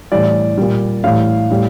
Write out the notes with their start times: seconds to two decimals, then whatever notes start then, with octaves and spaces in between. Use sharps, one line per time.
0.12 A2 E3 G3 D5
0.58 A#2 G3
1.04 A2 E3 G3 F5
1.50 A2 G3